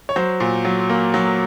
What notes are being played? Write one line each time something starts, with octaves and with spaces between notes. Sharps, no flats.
C#5
F#3 C5
A#2
F#3
A#3
F#3